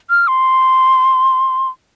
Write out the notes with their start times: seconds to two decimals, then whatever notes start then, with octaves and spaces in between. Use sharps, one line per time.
0.10 F6
0.28 C6